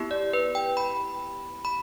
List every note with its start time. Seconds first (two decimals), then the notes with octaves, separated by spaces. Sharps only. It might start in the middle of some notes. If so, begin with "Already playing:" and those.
Already playing: B3 E4 G4
0.11 D5
0.33 B4
0.55 G5
0.77 B5
1.65 B5